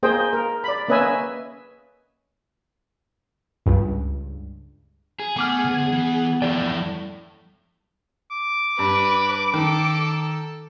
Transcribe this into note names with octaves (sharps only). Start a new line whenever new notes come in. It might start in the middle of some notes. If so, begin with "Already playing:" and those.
A#3 G#4 C5 D#5 G5
A#4
D5 B5
A#3 C#4 B4 D#5 E5 G#5
C#2 G2
G#4
A3 B3 G#5 D6 F6
D2
E3
F2 E3 E4 A4 D5 G5
D6
G2 B4
D#3 A4